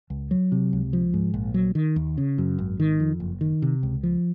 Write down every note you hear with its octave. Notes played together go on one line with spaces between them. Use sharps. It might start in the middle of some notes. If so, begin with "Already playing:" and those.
C#2
F#3
C3
C#2
F3
G#2
A#1
F#3
D#3
D#2
C#3
F#2
G#1
D#3
F2
F#1
D#3
C3
C#2
F3